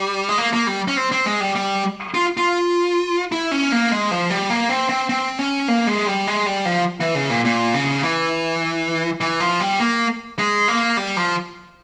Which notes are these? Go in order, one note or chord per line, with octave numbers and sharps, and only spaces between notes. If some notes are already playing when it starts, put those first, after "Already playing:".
Already playing: G3
G#3
A#3
A#3
G3
C#4
C4
C4
G#3
G3
G3
F4
F4
E4
C#4
A#3
G#3
F3
G3
A#3
C4
C4
C4
C#4
A#3
G#3
G3
G#3
G3
F3
E3
C#3
A#2
A#2
C#3
E3
E3
F3
G3
A#3
G#3
A#3
G3
F3